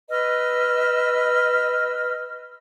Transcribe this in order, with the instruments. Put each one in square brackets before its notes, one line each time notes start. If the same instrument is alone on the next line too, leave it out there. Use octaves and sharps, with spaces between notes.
[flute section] B4 D#5 E6 F6